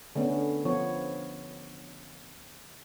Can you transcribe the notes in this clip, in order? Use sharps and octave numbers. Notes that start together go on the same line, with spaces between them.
D3 A3 B3 C#4
F3 B3 C#5